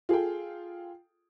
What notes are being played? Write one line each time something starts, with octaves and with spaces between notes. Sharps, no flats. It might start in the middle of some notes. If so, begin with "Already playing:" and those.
F4 G#4 A4 G5